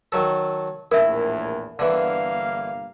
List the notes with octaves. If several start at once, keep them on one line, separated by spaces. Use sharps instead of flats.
D#3 F#3 A4
A#1 E2 A2 E4 A#4 E5
G1 D3 E3 A#3 F5